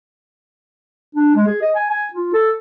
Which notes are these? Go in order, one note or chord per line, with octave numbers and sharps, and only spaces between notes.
D4
G#3
G#4
D#5
G#5
G#5
F4
A4